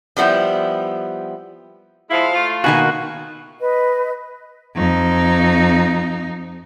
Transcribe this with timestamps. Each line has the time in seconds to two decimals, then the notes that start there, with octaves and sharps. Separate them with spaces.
0.16 F3 G3 B3 E4
2.10 F3 G#3 E4 F5
2.33 A3 F4
2.64 B2 D#3 A#3 F#4 G#5
3.60 B4 D#5
4.75 F2 D#4